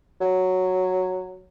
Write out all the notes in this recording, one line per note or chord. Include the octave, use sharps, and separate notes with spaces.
F#3